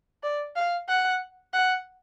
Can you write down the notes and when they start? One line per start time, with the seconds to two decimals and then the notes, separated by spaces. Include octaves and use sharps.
0.23 D5
0.56 F5
0.89 F#5
1.53 F#5